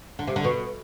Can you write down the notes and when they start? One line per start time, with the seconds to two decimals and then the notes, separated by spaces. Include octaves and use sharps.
0.19 D3
0.27 C3
0.36 D3
0.44 B2